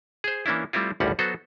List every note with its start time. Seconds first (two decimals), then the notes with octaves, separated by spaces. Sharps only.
0.24 G#4 C5
0.46 E3 A#3 C#4 D4 E4
0.73 G3 A3 C4 E4 F4
1.00 G#1 D2 A2 G3 C#4 F#5
1.19 F#3 B3 F#4 A4 C5